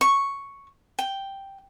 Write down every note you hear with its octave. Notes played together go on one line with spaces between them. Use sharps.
C#6
G5